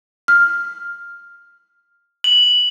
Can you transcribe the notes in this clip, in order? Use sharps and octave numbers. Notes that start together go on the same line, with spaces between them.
F6
F#7